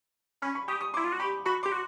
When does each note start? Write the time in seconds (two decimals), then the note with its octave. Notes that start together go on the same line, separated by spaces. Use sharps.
0.42 C#4 B5 C#6
0.55 B5 C#6
0.68 G4 C#6 D#6
0.81 C#6 D#6
0.94 C6 D6
0.97 E4
1.04 F4
1.12 F#4
1.20 G4 B5 C#6
1.46 F#4 B5 C#6
1.63 C6 D6
1.66 G4
1.72 F#4